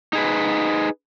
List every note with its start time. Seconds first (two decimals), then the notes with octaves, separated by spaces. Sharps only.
0.13 D#4 G#4 B4